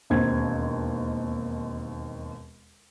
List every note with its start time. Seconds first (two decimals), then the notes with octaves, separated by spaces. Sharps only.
0.10 E1 D#2 C4 G#6